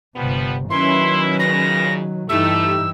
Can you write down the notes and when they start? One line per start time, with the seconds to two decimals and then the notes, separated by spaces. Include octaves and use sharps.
0.16 G1 C3 F3 G3 B3
0.70 D#3 F#3 A#3 C#4 E4 B4 C6
1.39 A#2 C#3 A#6
2.29 G2 E3 A3 D#4 E4 G4 E6